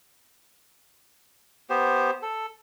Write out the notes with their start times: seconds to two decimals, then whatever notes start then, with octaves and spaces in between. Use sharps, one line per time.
1.70 B3 G4 C5
2.22 A4